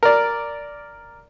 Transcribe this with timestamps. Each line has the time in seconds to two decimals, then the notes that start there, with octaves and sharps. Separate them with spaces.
0.03 A#4 D5